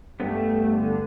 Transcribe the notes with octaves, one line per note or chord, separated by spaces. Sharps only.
G2 G3 A3 B3
D3